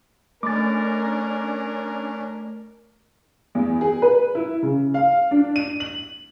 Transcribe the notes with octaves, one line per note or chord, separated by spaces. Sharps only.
A3 C#4 D4 A#4 D6 A6
E2
G#4
B4
E4
C#3
F5
D4
D#7
F#7